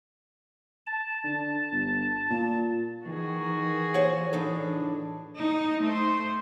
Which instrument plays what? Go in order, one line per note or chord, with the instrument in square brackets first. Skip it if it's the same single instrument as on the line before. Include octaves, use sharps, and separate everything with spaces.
[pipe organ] A5
[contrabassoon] D3
G1
A#2
[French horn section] D#3 [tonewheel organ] E3 [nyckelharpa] F#4 G#4
[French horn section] A#2 [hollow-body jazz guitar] C5 C#5 F#5
[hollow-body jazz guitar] A2 D#4 A4 [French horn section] D4
[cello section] D#4
A3 C5